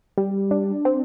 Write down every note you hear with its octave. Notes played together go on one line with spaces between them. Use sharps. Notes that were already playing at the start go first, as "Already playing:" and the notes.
G3
D4
C4